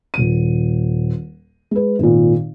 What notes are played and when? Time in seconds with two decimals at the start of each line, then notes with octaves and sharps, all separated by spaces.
0.14 D#1 D#7
1.71 G#3 B4
1.99 G#1 A#2